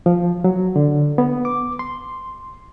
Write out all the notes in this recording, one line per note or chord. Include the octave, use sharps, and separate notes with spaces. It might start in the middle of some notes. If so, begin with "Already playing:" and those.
F3
F#3
D3
B3
D6
C6